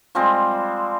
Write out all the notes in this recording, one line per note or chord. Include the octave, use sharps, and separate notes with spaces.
F3 G3 G#3 C4